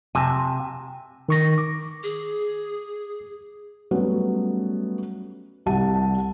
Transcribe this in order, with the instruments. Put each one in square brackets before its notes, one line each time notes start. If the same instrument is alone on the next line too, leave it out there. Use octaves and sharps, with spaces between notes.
[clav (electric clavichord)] C3 [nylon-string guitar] G#5 A5
[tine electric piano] D#3 C#6 A#6
D6
[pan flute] G#4
[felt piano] F#3 G3 A3 B3 C#4
C2 G3 F#5 A5 D#7